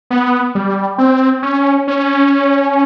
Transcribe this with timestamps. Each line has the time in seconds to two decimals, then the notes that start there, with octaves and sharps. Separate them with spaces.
0.10 B3
0.55 G3
0.98 C4
1.43 C#4
1.87 C#4